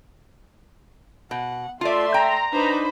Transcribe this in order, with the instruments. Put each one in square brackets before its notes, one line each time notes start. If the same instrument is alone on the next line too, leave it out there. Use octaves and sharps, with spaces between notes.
[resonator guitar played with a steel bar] B2 [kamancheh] F#5
[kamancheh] A3 E5 [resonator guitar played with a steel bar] F4 D5 [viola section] C6
[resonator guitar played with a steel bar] G5 [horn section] A#5
[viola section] D4 D#4 B4 [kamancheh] C5 B5